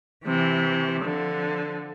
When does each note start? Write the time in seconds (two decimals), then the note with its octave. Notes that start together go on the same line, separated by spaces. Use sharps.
0.24 C3 E3
1.03 D3 F3